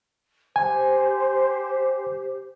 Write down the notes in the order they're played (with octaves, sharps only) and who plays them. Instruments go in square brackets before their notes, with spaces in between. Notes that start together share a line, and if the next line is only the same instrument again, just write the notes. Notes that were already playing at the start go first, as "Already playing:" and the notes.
[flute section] G4 C5 [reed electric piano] G#5